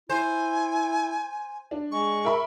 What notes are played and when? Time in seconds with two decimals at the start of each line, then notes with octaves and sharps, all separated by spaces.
0.09 E4 C5 G#5
1.71 D4
1.92 G#3 C#6
2.24 A#4 E5 B5